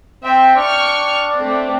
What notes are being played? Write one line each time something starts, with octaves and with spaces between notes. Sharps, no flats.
C4 E5 G5
D4 G5 C#6 F6
A3 C4